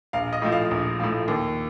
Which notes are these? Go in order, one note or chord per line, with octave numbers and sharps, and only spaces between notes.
A#1 F5
D#5
A2 F3
F5
A#1
A2 F3
D#2